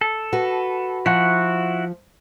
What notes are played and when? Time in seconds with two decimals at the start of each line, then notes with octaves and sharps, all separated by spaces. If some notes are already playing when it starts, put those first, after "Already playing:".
0.01 A4
0.33 F#4 B4
1.06 F3 E4 F#4 F#5